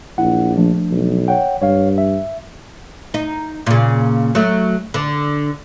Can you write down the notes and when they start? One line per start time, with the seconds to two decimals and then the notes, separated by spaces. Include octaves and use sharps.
0.18 A#1 E4 F#5
0.57 F3 A3 D4
0.91 B1
1.28 C#5 F#5 G5
1.62 G2 C#5 F5
1.98 E5
3.14 D#4
3.66 A#2 C#3
4.35 F#3 A3
4.94 D3 D4